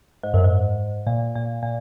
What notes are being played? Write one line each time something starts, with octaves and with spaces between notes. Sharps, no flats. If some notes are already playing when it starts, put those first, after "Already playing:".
G#2
F#2
G#2
A#2
A#2
A#2